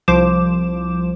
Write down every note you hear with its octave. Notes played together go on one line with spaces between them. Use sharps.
C2 F3 C5 D6 E7